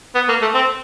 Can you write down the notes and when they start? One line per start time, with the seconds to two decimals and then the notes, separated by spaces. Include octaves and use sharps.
0.15 B3
0.28 A#3
0.42 A3
0.54 C4